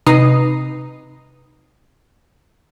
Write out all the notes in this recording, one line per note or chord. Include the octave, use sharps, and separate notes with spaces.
C3 D#4 B4 A#5 D#6 C7